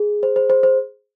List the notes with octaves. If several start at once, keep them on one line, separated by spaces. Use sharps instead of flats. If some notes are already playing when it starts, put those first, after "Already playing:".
Already playing: G#4
C5
C5
C5
C5